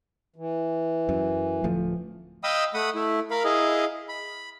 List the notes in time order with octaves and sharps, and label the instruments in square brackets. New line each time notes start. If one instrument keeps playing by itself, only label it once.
[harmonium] E3
[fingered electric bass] F#2
D1 F3 A3
[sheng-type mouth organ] D#5 F5 G5 B5 D#6 E6
A3 F#5 B5 D#6
A3 E4
A#4 F5 B5
E4 G#4 D#5 F5
B5